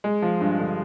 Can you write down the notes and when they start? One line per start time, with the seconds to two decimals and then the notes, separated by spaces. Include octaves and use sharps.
0.04 G#3
0.22 F3
0.41 G2
0.59 D3